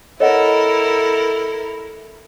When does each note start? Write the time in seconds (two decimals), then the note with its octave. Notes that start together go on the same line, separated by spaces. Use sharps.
0.20 E4 A4 A#4 C#5 D#5 F#5